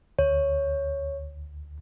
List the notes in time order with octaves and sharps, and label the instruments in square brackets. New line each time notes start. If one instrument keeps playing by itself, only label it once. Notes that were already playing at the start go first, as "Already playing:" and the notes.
[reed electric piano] D2 [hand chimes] C#5